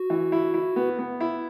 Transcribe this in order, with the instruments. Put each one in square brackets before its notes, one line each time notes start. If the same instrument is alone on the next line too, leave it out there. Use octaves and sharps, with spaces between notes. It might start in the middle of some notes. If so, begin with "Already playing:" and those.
Already playing: [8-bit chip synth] F#4
[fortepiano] E3
E4
E4
B3
B3
E4